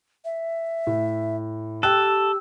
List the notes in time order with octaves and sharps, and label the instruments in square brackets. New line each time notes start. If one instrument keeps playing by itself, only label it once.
[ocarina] E5
[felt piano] A2
[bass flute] G4 [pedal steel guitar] A4 [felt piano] G5 F#6 [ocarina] E6